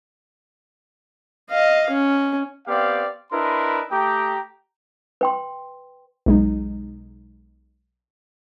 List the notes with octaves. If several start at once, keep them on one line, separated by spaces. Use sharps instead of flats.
D#5 F5
C#4
B3 C4 G4 D5 F5
D4 E4 A#4 B4 D#5 C6
A3 G4 G5 A#5 D6 D#6
B4 G5 C6
B1 G#3 D#4